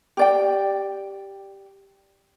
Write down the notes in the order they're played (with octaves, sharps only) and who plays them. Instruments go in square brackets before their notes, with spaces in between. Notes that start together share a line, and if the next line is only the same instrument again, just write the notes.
[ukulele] G4 D5 G5